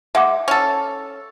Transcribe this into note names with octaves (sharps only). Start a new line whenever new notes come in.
G#3 E5 F#5 D6
C#4 A4